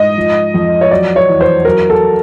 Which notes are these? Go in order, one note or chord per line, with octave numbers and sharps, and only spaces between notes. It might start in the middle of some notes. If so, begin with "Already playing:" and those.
Already playing: G#2 D#5
F3
F2
C#5
F#3 D5
C#5
E2
C5
F#3 A#4
A4